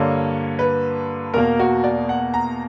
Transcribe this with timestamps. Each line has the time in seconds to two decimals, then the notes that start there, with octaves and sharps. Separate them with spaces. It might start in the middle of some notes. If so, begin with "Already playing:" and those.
Already playing: G2 D3 A#3 C#5
0.59 B4
1.34 E2 B2 A#3 A#4
1.59 F#4
1.84 D5
2.09 F#5
2.34 A#5